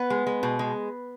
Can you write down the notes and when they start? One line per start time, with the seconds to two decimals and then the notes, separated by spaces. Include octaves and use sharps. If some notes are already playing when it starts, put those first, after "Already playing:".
Already playing: B3 B4
0.10 G#3
0.27 G#3
0.43 B2
0.59 G#3